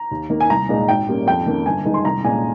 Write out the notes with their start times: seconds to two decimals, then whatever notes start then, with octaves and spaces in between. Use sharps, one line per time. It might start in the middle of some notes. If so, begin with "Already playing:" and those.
Already playing: A#5
0.11 D#2
0.30 D#3 A#3
0.40 G#5
0.50 C2 A#5
0.69 A#2 G#3 D#4
0.88 G#1 G5
1.08 G#2 G3 A#3 C#4
1.27 F2 G5
1.46 D#3 A#3 C#4
1.66 G1 G#5
1.85 G2 D#3 G#3 D#4
1.94 C6
2.04 C2 A#5
2.24 A#2 G#3 C#4 G#5